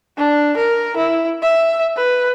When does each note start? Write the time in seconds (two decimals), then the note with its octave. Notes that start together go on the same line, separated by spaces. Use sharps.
0.17 D4
0.57 A#4
0.97 E4
1.42 E5
1.97 B4